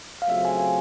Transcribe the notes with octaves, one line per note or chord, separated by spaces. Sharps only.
F5
C#3 F#3 A3 C4 F4 E5
G#5
G#5